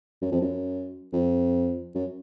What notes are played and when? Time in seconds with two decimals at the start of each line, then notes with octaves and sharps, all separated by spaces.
0.22 F#2
0.32 F2
0.41 F#2
1.13 F2
1.95 F#2